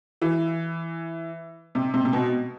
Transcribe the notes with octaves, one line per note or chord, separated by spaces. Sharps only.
E3
C3
C3
C3
B2